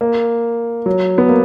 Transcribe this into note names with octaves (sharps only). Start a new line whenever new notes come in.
A#3
F#3
B3
A#3